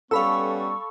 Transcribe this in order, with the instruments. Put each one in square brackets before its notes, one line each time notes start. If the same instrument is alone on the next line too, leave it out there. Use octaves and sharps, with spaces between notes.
[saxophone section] G3 B3 C#4 [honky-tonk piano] A4 [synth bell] F5 B5 E6 [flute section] C#6